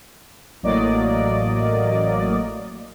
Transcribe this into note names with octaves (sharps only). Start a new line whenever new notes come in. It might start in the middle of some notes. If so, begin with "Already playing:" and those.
A1 A2 F#3 A#3 D5 D#5